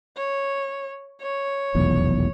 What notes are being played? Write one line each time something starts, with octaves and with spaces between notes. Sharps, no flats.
C#5
C#5
F1 B1 E2